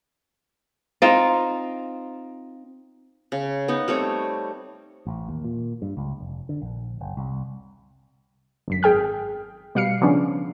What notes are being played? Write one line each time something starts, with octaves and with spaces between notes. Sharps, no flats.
C4 D#4 F4
C#3
B3 D#4
G3 A3 C4 C#5
A1
D#2
A#2
G2
C#2
F1
D3
A#1
F#1
C2
G1 F#2 B6
G#1 G#4 G5 F6
B2 G3 F5 F6 C7 C#7
C#3 F3 B3 C#4 D4